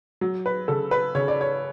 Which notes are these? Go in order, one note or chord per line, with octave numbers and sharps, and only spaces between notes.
F#3
B4
C#3 A4
B4
C#3 C#5
D5
C#5